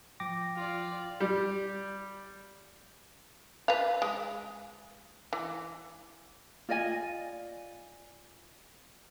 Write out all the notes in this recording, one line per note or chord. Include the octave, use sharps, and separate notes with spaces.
F3 G5 D6 A#6
F4 D5
G3
B4 F5
G#3
E3
F4 D5 D#5 G#5